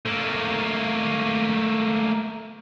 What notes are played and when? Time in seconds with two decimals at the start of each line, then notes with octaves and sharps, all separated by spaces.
0.06 A3 A#3